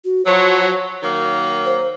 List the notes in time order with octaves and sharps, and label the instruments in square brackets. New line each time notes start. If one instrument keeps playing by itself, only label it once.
[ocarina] F#4
[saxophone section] F3 F#3 [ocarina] C#5
[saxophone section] D#3 F#3 A#3
[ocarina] C5